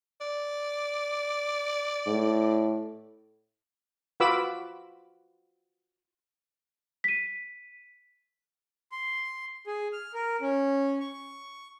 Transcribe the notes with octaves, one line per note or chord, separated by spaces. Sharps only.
D5
A2
F4 F#4 B4 B5 D6 E6
B6 D#7
C6
G#4
F6
A#4
C#4
C#6